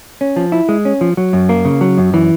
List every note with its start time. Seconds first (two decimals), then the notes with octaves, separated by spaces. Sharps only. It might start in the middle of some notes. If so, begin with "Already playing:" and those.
0.21 C#4
0.36 F3
0.52 E4
0.69 G#3
0.85 C#4
1.01 F3
1.17 F#3
1.33 F#2
1.49 A#3
1.65 C#3
1.81 F#3
1.98 F#2
2.14 E3